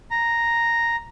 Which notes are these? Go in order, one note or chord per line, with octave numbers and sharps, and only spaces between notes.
A#5